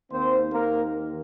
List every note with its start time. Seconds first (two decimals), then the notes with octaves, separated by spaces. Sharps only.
0.10 D#2 D#3 A#3 C4 C5
0.52 A#3 A#4